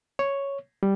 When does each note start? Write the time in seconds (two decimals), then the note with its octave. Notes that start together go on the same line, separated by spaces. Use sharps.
0.19 C#5
0.83 G3